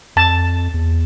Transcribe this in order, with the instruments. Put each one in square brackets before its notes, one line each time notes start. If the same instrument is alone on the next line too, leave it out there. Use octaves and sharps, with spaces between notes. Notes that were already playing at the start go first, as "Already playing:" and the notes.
[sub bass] F2 [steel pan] A5
[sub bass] E2